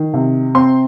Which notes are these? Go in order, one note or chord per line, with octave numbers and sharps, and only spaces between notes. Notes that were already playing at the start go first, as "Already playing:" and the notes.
Already playing: D#3
C3
C4 C6